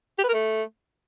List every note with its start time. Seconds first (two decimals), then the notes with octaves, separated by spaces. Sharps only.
0.18 G4
0.23 B4
0.29 A#4
0.34 A3